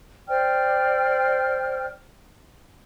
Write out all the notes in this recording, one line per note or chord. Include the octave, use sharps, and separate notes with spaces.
C5 D5 G5 F6